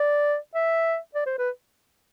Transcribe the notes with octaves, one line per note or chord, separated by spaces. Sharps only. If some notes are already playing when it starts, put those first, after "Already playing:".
Already playing: D5
E5
D5
C5
B4